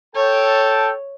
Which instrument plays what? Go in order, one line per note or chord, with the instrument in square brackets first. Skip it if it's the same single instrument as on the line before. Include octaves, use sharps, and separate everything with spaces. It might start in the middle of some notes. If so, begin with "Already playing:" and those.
[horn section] A4 G5 A5 [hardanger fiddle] C#5